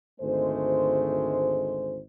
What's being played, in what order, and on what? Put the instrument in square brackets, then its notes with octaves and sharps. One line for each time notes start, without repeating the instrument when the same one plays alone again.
[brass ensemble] G#1 D2 G#3 A3 C5